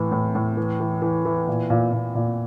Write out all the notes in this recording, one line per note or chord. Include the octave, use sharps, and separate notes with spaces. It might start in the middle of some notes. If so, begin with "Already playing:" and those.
Already playing: A2 E3
A2
A2
E3
E3
E3
E3
A#2
A#2
A#2
A#2